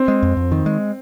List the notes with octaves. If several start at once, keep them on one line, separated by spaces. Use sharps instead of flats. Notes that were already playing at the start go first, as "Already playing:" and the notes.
Already playing: C4
G#3
F2
F2
D#3
G#3